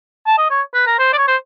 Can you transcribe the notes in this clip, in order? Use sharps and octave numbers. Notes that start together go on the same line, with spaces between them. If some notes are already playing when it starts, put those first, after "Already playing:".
A5
D#5
C#5
B4
A#4
C5
D5
C#5
C5